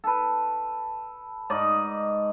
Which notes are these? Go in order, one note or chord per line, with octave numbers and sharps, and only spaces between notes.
A4 B4
G#2 D#4 D5 D#5